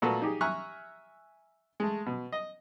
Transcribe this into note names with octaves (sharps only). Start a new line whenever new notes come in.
A#2 A3 B3 F#4 A4
D#4 G4 G#4
E5 G#5 A#5 C#6 F6 F#6
G#3 A3
B2
D#5